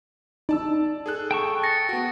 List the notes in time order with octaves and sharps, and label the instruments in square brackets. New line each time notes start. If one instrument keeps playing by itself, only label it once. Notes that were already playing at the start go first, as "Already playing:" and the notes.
[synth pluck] D#4 [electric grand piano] D5 A5 E6
[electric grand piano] G#4 A4 F#6
[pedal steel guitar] G5 A5 C#6
[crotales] A6 A#6 C#7
[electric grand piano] B3 F#4